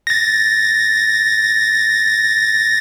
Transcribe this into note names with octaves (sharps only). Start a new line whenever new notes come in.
A6 A#6